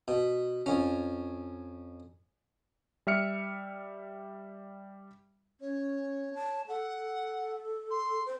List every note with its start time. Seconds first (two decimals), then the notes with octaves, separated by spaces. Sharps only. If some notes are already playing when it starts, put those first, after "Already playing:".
0.08 B2
0.66 F2 C#4
3.07 G3 E5 F6 C#7
5.61 C#4 C#5
6.35 A5
6.68 A4 F#5
7.90 C6
8.26 C5